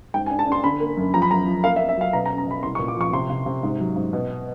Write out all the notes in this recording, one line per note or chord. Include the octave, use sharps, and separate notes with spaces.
G#2 G5
G#5
D4
A5
D4 C6
D3 B5
A#3
F#2
F3 A#5
B5
F#2 A#5
F3
A#3 F5
E5
A#3
E5
F#3 F5
B2 A#5
A#5
C#4
A#5
B2 B5
C2 C6
C#6
A#2
D6
F3 C#6
C3 C6
C3
C3
G#2
F#3
G#2
B2